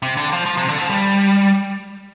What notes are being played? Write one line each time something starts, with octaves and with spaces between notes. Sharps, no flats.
C3
D3
F3
F3
C3
D3
F3
G3